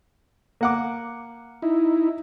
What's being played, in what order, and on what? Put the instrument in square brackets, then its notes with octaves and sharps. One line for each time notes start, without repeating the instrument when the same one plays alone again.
[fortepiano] A#3 F#5 D6
[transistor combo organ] D#4 E4